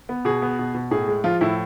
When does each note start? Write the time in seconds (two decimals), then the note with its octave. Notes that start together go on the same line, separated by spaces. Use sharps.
0.09 B3
0.25 B2 G#4
0.42 B3
0.59 B2
0.74 B2
0.91 A2 G#4
1.08 G#3
1.24 F3 F4
1.41 A2 E4